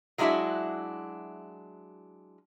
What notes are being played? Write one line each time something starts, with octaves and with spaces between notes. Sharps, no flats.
F#3 G#3 D4 E4 F#4 E5